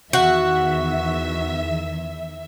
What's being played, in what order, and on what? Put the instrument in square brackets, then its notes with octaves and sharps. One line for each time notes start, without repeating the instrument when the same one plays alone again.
[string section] E2 D#3 E5 [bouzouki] F#4